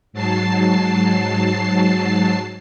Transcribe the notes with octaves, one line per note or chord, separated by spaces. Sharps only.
G#2 F#3 A5 C7